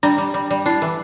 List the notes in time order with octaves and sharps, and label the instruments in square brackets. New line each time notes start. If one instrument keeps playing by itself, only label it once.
[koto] G3 [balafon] D4
[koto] G3
G3
G3
[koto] D4 [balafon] E4
[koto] E3